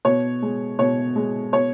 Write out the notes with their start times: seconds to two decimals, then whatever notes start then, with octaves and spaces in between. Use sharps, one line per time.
0.05 B2 C#5
0.42 G#3
0.79 B2 C#5
1.16 G#3
1.53 B2 C#5